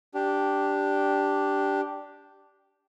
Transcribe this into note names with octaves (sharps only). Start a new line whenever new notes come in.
D4 G4